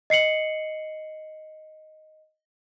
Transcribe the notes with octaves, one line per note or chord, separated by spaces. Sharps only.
D#5 C7 C#7 F#7